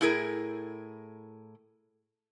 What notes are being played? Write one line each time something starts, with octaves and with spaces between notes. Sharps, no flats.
A2 E4 G#4 A#4